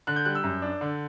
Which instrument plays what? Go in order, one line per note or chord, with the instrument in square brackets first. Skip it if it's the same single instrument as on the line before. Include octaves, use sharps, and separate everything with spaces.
[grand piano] D3 F#6
G6
G3 F#6
E6
F#2
D4
D3